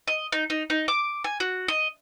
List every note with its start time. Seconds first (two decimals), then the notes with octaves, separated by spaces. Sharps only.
0.07 D#5
0.32 D#4
0.50 D#4
0.70 D#4
0.88 D6
1.24 G#5
1.40 F#4
1.68 D#5